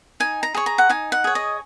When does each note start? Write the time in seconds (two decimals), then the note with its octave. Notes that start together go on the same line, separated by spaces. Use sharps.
0.20 D#4 G#5
0.43 A#5
0.55 G#4 C#5 C#6
0.66 A#5
0.78 F#5
0.89 D#4 G#5
1.12 F#5
1.24 G#4 C#5
1.35 D#5